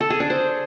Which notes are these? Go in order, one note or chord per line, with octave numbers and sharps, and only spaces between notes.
A4
G#4
D4
C5